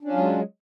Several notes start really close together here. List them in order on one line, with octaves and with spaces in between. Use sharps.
D4 C#4 F4 F#3 G#3